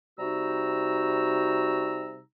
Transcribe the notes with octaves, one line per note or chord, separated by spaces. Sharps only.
C3 G3 D#4 F#4 A#5 E6